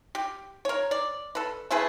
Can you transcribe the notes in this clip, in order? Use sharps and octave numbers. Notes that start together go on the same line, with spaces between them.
G4
A#4 C#5
D5
A4 B4
A3 E4 G#4 B4